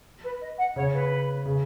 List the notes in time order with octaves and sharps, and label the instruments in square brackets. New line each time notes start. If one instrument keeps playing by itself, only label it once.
[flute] B4
D#5
F#5
[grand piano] C#3 [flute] C#5
[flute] B4
[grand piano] C#3